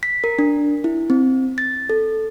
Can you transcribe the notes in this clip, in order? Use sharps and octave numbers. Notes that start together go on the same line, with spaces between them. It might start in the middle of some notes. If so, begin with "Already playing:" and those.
B6
A#4
D4
E4
C4
A6
A4